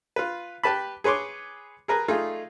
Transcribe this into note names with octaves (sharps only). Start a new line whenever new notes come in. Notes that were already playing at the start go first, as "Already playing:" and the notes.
F4 B4
G4 B4 A5 B5
G#4 B4 C#5 C6 D6
G#4 A#4 B4 A#5
A3 D#4 F4 G#4